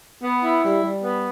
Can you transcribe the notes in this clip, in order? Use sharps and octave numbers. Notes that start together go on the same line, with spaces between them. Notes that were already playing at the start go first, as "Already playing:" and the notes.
B3
E4
G3
G3
B3